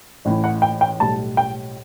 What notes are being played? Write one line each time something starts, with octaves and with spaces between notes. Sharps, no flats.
A1 A2 E3
F#5
G5
G5
B1 A2 G3 A5
G5